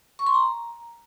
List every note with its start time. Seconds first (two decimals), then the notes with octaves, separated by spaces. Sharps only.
0.19 C#6
0.27 C6
0.34 A#5